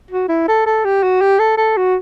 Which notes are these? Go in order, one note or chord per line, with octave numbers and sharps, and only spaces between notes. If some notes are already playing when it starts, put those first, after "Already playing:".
F#4
E4
A4
A4
G4
F#4
G4
A4
A4
F#4